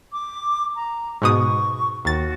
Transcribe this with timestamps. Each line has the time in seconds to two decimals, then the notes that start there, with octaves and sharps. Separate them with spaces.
0.12 D6
0.76 A#5
1.22 G#2 B2 C#6 D#6
2.05 D#2 F#4 A6